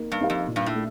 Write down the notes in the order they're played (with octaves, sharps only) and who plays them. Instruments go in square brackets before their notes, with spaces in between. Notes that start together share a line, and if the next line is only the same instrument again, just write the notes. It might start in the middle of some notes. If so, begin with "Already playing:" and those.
Already playing: [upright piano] A#3 D#4
[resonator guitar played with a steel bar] G2
[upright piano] D#4 G4 A#4 F5
[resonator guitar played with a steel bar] F2
[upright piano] A#2
[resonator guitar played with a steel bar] G2
A2
[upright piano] A3